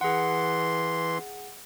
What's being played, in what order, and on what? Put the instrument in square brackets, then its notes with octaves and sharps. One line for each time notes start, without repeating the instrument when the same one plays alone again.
[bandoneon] E3 C6 [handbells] G#4 F#5